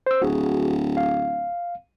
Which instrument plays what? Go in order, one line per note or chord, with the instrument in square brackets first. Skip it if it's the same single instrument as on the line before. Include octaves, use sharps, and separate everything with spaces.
[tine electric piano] C5 E6
[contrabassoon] D1 [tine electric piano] F#4 G#4
[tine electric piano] F5